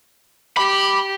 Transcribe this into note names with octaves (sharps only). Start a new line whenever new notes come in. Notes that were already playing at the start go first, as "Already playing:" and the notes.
G4 B5 D6